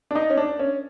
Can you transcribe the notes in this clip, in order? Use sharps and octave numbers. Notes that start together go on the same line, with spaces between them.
D4
D#4
C#4
D4
C#4